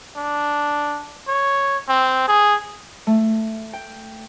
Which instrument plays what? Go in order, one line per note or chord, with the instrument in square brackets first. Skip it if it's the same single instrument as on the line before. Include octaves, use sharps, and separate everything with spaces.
[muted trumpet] D4
C#5
C4
G#4
[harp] A3
G5